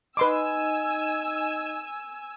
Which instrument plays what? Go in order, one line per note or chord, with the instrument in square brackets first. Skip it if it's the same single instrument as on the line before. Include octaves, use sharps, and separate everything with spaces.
[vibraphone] D#4 D#5 [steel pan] B4 C6 D6 [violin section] G#5 E6